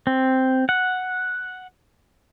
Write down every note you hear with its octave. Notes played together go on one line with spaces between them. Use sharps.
C4
F#5